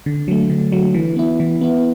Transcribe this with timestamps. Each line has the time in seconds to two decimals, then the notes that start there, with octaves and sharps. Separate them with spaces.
0.06 D3
0.28 F#3 A3
0.50 D3
0.72 F#3 A3
0.94 E3
1.16 B3 E4
1.40 E3
1.61 B3 E4